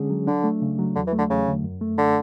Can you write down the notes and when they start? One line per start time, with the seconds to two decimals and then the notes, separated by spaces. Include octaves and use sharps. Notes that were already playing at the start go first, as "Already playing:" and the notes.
Already playing: D3 G#3 C#4 G#4
0.10 F#3
0.27 D3 D4
0.44 A3
0.62 C#3
0.79 F#3
0.96 E2 D3
1.07 E3
1.12 A3
1.19 D3
1.30 E2 C#3
1.47 D3
1.64 F#2
1.81 A3
1.98 D3